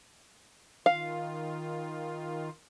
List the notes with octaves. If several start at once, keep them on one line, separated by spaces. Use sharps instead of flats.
D#3 F4 F5